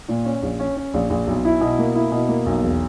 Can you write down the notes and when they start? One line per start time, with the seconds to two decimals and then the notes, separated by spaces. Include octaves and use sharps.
0.09 A#2
0.25 C#4
0.42 A#1
0.60 C#4
0.77 C#4
0.94 A#1
1.10 A#1
1.27 B1
1.45 E4
1.61 B2
1.79 A#3
1.95 E4
2.12 B2
2.29 A#3
2.46 B1
2.63 E1